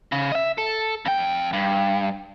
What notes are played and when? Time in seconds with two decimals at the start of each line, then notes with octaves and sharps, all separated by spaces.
0.12 C#3
0.32 D#5 E5
0.58 A4
1.06 F2 G5
1.53 G2